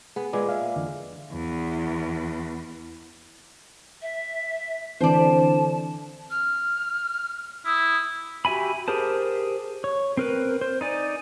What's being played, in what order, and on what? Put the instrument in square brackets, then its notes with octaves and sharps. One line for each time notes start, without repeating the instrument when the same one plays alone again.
[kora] B3 [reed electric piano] G#4
[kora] A#2 G#3 [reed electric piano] B4 G#5 D6
[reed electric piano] E5 F5
F2 D3 E3
[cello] E2
[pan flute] E5
[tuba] D3 [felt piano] E3 C4 [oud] C5 D5 [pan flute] A5
[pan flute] F6
[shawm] E4 [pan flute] D#6
[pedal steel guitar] F#4 G4 E5 G#5 B5
G4 G#4 A#4 C5 A5
C#5
C4 A#4 B4
C5
D#4 D5 G#5